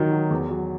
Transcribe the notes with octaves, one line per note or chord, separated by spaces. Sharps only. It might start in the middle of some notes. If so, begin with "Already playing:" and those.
Already playing: D#3 F#3
F#3
E2
F#3